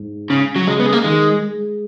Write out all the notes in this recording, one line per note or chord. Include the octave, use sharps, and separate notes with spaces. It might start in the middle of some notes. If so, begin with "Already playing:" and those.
Already playing: G#2
C#3
F#3
C#3 G#3
B3
G#3
A#3
D#3 G#3
G#3